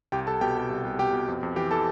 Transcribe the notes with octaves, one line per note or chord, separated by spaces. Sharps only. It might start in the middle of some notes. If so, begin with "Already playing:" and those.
C2 G4 G5
C2 A4 A5
B2 G4 G5
B2
C2
C2
B2 G4 G5
B2
F2
F2
E3 G4 G5
E3 A4 A5